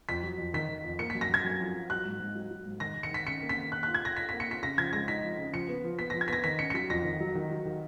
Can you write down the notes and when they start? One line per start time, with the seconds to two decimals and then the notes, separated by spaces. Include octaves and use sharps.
0.09 F2 B6
0.23 F#3
0.38 F2
0.54 D#3 B6
0.69 D#3
0.84 F2
0.99 A#3 C#7
1.10 F#2 B6
1.21 A#6
1.29 F#2 G#6
1.44 F#2
1.60 F3
1.75 F3
1.90 F#3 F#6
2.05 G#2
2.20 G#2
2.35 F#3
2.50 F#3
2.66 G#2
2.80 D#3 A#6
2.96 D#3
3.03 C#7
3.11 D#3 B6
3.26 C#4 C#7
3.41 A#3
3.49 B6
3.56 D#3
3.72 A#3 F#6
3.83 F4 F#6
3.95 G#6
4.02 F4 A#6
4.16 F4 B6
4.29 A#3 B6
4.40 C#7
4.47 F4 B6
4.62 C#3 A#6
4.78 F3 G#6
4.93 G#3 A#6
5.08 D#4 B6
5.23 F3
5.38 C#3
5.53 F3 C#7
5.69 B3
5.84 F3
5.99 B3 B6
6.10 F3 A#6
6.21 G#6
6.28 B3 A#6 B6
6.44 D#3 B6
6.59 C#4 C#7
6.70 C#7
6.74 F#3 B6
6.90 F2 A#6
7.05 D#3
7.20 F#3
7.35 D#3
7.50 F#3
7.65 D#3